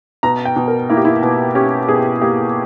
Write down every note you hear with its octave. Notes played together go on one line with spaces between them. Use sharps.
B2 A#5
G5
B2
A#4
A#3 E4
G4
E4
B2
C#4 G4
B2 G#4
A#3 G4